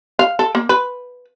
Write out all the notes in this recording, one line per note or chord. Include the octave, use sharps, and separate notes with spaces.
F5
A4
A#3
B4